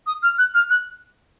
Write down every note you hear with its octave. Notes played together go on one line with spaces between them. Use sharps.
D#6
F6
F#6
F6
F#6